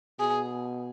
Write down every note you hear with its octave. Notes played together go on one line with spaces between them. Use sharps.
B2 G#4